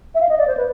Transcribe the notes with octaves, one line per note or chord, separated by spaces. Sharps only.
E5
F5
D#5
D5
C5
B4